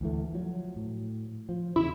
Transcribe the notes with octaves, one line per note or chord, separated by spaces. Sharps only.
D2 E3 A3
F3 F#3
A2
F3
E2 C#3 E4